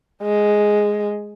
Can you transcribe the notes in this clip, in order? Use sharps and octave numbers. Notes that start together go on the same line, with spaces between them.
G#3